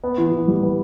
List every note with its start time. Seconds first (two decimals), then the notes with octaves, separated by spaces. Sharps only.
0.04 B3
0.18 E3
0.32 E3
0.48 G3
0.63 B3